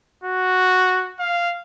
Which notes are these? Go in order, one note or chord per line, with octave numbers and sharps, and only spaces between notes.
F#4
F5